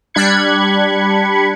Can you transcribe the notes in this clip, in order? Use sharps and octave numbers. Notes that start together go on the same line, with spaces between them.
G3 D4 B5 F#6 G#6 C#7